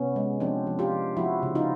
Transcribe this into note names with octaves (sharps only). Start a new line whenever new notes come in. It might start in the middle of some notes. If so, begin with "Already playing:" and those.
Already playing: C3 B3 C#4
G#3
F3 C4 D4
F3
F4 G4
F3
F3 E4 F#4
C#3
D#4 F4